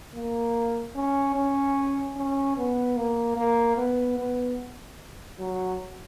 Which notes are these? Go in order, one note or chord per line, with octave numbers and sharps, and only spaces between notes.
A#3
C#4
C#4
C#4
B3
A#3
A#3
B3
B3
F#3